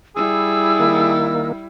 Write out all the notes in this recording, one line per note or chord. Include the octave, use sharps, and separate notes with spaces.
G3 E4 G#4 E6
D#3 A#3